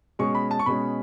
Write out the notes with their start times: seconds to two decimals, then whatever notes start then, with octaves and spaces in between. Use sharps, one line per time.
0.19 B2 G#3 C#4 C#6
0.35 B5
0.51 A5
0.59 C#6
0.66 B2 G#3 C#4 B5